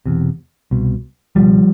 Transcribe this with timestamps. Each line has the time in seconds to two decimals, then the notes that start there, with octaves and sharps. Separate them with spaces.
0.06 E1 E2 C3
0.71 C2 B2
1.35 C#2 B2 F3 G3